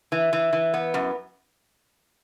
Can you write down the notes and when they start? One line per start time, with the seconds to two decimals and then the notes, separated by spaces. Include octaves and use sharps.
0.12 E3
0.33 E3
0.53 E3
0.74 B3
0.94 F#2